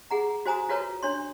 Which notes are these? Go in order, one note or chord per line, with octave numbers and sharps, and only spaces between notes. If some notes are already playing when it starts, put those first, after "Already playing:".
G#4 F#5 A#5
F#4 C5 G#5 A#5 D#6
F4 F#4 A4 B4 C#5 A#5
D4 C#5 C6